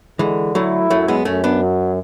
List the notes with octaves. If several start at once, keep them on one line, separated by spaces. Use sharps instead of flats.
D3 E3 G#3
F#3 A3 E4
F#2 F#3 A3
G#3 B3
F#2 A3 C#4
B3 D4
F#3